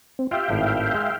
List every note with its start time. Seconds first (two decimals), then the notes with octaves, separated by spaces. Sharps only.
0.19 C4
0.31 F4 G4 E5 F5 G5
0.50 G#1 A2
0.94 G#3